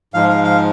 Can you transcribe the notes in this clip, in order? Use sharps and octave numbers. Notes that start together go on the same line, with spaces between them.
G#2 F3 G#3 F5
F5
F5